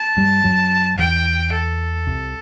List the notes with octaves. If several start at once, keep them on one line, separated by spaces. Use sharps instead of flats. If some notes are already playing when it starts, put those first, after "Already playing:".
Already playing: A5
G2 G3
F#2 F#3
E2 E3 G5
A4
C2 C3